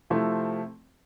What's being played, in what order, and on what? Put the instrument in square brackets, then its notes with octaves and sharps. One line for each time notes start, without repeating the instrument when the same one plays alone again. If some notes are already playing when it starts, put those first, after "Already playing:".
[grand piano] C3 F3 A3 C4 E4